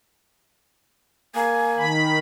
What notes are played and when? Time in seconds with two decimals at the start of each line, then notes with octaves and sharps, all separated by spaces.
1.35 A#3 G#5
1.78 D#3 B5